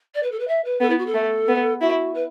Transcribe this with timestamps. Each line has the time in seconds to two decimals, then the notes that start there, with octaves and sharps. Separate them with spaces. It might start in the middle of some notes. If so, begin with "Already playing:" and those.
0.14 D5
0.22 B4
0.31 A4
0.39 B4
0.47 E5
0.64 B4
0.80 B3 A4
0.90 E4
0.98 F#4
1.06 A4
1.14 A3
1.48 B3
1.81 E4 F#4
2.14 B4